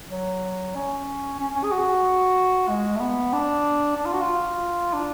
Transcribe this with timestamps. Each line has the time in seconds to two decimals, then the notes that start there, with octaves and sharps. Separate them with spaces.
0.11 F#3
0.75 C#4
1.39 C#4
1.55 C#4
1.64 G#4
1.72 F#4
2.68 G#3
2.96 A3
3.00 B3
3.33 D4
3.96 D4
4.06 F4
4.13 F#4
4.22 F4
4.93 D4